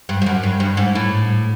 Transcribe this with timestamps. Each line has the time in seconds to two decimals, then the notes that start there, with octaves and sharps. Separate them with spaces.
0.09 G2
0.22 G2
0.26 F#2
0.43 G2
0.60 G2
0.77 G#2
0.95 A2